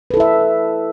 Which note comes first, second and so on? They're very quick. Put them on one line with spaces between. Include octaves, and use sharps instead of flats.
B4 A4 E4 E5